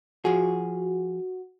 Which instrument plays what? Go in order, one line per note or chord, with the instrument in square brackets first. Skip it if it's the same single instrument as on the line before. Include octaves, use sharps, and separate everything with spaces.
[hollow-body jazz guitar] F3 G#4 [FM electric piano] F#4